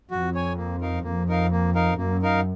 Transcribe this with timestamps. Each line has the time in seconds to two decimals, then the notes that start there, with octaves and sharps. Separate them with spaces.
0.10 F2 F#4
0.34 C#5 G#5
0.57 A#3
0.81 D#4 A#4 F5
1.04 F2 A#3
1.28 D#4 A#4 F5
1.52 A#3
1.75 D#4 A#4 F5
1.98 F#2 A#3
2.22 D#4 A#4 F5